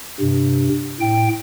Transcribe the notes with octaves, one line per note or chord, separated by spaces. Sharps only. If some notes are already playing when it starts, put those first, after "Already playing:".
G2 C3
A2 G5